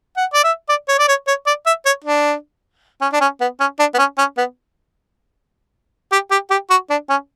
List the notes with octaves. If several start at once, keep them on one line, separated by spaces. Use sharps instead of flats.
F#5
D5
E5
D5
C#5
D5
C#5
C#5
D5
E5
C#5
D4
C#4
D4
C#4
B3
C#4
D4
B3
C#4
C#4
B3
G4
G4
G4
F#4
D4
C#4